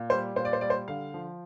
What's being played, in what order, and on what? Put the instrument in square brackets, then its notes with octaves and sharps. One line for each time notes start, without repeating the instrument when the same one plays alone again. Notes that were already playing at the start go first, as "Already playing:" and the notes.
Already playing: [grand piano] A#2
G3 C5
A#2 C5
D5
C5
G3 D5
C5
D3 F5
F3